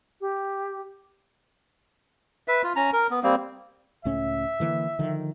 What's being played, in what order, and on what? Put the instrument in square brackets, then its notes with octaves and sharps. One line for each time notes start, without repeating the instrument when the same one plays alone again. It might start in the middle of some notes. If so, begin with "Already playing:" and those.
[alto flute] G4
[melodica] B4 E5
F4
C#4 A#5
A#4
B3
G3 A#3 C4
[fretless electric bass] C#2 A2 C#4 [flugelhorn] E5
[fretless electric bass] D3 E3 A#3
D3 D#3 F3